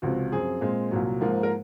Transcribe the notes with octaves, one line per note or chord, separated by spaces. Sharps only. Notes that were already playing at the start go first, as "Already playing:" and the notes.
C#2 C3 F3 F#4
F#2 F3 C4 G#4
A#2 G#3 C4
C2 A#2 F#3
G#2 F3 A#3
A#4